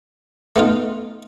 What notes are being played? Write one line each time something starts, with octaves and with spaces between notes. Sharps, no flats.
A3 B3 D#4 F4